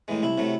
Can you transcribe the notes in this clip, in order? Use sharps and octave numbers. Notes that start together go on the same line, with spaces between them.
A2 E3 G#3
C2 E4
C3 F#3 A3